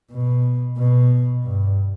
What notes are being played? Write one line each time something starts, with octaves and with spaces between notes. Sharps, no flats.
B2
B2
G2